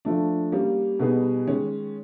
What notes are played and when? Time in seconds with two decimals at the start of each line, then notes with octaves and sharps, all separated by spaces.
0.05 F3 A3 D4
0.52 G3 A#3 C#4
0.99 B2 G3 B3 D#4 G#4
1.47 D#3 G#3 C#4